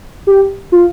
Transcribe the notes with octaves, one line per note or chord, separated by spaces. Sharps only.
G4
F4